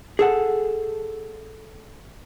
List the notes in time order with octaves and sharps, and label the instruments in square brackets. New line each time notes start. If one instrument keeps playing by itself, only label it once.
[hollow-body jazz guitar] G#4 A4 F#5